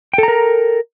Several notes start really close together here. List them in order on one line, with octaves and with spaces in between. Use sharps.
G5 A4 A#5 A#4